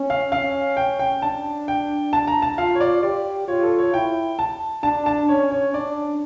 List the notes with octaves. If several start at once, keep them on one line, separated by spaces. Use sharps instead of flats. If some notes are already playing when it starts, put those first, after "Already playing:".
Already playing: C#4
F5
C#4 F5
G5
G5
D4 A5
G5
A5
A#5
A5
F4 F5
C#5
D5
G4 D5
F4 C#5
A4
C#5
E4 G5
A5
D4 A5
A5
C#4 C#5
C#5
D4 D5